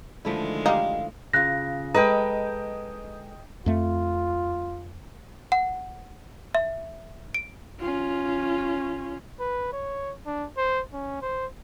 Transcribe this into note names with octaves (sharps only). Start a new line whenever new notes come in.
D3 D#3 F3 G#3 A3 E4
G3 D#4 F5
C#3 F4 F#6 A#6
G#3 A4 B4 D#5 G5 A#5
F2 A3 F4
F#5
E5
D7
C#4 F4
B4
C#5
D4
C5
C#4
C5